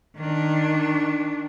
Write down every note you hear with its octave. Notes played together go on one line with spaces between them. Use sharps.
D#3 D4